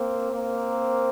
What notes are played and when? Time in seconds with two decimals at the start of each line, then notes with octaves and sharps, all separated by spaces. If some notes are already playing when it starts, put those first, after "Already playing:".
Already playing: A#3 C4
0.31 A#3 C4